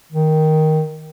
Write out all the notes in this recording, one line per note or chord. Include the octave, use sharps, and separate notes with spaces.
D#3